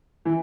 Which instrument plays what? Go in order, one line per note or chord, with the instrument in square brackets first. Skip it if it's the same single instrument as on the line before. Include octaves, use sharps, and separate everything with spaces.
[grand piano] E3